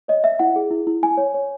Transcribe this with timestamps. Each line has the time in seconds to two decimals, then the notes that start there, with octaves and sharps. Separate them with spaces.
0.08 C#5 D#5
0.24 C#5 E5
0.39 E4 F#5
0.56 G#4
0.71 E4
0.87 E4
1.03 E4 G#5
1.17 C#5
1.34 C#5